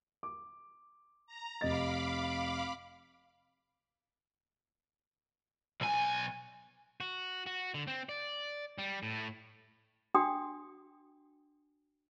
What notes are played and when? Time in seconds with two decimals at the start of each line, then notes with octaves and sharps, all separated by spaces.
0.23 D6
1.27 A#5
1.61 F1 D#5 F5 B5 D6 A6
5.81 B1 G#5
7.01 F#4
7.46 F#4
7.74 D3
7.88 C4
8.09 D5
8.78 G3
9.03 A2
10.15 D4 F#4 G5 D#6